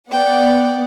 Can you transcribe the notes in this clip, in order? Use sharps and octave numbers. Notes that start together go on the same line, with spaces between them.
B3 D5 F#5 G5